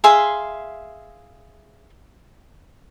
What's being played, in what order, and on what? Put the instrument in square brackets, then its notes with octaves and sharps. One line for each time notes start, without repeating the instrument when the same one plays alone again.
[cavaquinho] G#4 E5 F5 C6